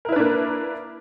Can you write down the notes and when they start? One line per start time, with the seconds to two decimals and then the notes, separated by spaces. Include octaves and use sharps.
0.05 A#4
0.09 E4
0.12 B4
0.16 D4
0.20 A#3